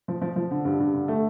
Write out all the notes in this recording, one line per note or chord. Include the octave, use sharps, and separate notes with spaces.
F3
F3
F3
D3
G2
G2
D3
A3